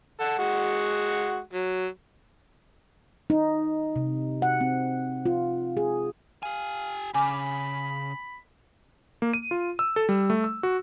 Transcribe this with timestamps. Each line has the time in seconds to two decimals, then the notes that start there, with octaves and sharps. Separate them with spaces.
0.20 A4 F#5
0.39 G#3 F#4 F#5
1.53 F#3
3.30 D#4
3.96 C3
4.42 F#5
4.61 C4
5.26 F4
5.77 G#4
6.43 G4 F5 G#5
7.14 C#3 G#5 B5 D6 F6
9.22 A#3
9.33 D#7
9.51 F4
9.79 E6
9.96 A4
10.09 G3
10.30 A3
10.44 E6
10.63 F#4